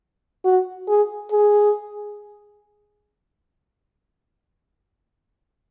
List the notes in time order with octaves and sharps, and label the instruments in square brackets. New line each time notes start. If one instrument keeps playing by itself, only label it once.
[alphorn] F#4
G#4
G#4